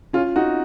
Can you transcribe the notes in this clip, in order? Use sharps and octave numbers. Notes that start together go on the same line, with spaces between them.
C#4 F4
D#4 F#4